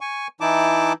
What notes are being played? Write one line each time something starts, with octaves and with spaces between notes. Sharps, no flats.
G#5 C#6
E3 D#4 E4 A5 D6